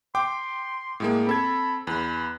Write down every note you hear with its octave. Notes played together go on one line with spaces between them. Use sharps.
G5 C6 D6
A2 G#3 A#3
C4 A4 B5 G#6
E2 B4